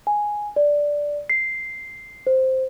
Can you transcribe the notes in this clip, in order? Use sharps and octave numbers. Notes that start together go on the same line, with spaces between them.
G#5
D5
C7
C5